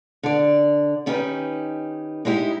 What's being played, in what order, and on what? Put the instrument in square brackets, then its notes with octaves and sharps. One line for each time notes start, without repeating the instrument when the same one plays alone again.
[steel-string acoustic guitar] D3 D5
D#3 C#4 D#4 G4 B4
G#3 D#4 E4 G4